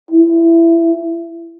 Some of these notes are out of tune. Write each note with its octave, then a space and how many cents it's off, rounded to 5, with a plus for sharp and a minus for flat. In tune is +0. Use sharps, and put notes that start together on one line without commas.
E4 +20